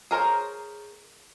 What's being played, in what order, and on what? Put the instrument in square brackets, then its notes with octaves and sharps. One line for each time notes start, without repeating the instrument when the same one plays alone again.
[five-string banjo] G#4 A#4 C5 C#5